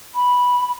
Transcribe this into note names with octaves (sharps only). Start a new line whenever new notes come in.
B5